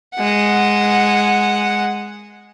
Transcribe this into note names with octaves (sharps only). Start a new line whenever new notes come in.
G#3 F#5